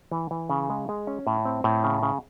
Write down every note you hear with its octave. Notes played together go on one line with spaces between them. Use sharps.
E3
E3
C#3
G#3
G#3
C#4
A2
C4
A2
C#3
C#3